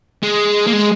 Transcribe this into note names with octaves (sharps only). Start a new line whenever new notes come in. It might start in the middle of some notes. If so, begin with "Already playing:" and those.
G#3
A#3
G#3